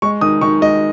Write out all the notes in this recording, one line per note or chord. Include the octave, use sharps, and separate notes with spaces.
G#3 C#6
D#3 D#6
D#3 C#6
G#3 D#5